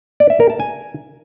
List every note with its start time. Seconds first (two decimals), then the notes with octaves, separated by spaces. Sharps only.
0.20 D5
0.30 E5
0.40 A#4
0.50 A5
0.60 G#5